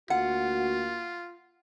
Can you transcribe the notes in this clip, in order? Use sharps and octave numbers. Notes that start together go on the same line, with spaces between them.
D2 A#3 F4 F#4 F#5